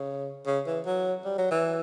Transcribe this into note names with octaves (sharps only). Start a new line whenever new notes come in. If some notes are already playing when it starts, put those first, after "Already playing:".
Already playing: C#3
C#3
E3
F#3
G3
F#3
E3